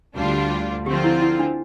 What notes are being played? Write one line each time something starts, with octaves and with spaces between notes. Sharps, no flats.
D2 D3 G3 D4 F4
D3 F3 C4 F4 G4
E4
E4
D4